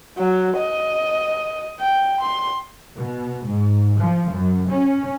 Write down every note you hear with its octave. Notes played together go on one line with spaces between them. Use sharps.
F#3
D#5
G5
C6
B2
G#2
F3
F#2
C#4